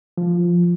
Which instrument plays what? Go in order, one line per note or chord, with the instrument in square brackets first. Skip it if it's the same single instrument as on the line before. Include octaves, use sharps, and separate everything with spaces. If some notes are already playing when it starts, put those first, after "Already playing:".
[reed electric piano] F3